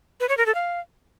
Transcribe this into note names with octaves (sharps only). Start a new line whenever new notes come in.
B4
C#5
A#4
A4
F5